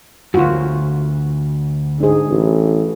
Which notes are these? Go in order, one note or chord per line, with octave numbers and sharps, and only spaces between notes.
D2 G2 F4 F#4
G#2 D4 G#4
A1